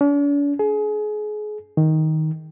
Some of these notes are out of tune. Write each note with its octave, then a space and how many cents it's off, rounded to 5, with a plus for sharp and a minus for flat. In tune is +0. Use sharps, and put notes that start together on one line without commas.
D4 -45
G#4 +30
D#3 +10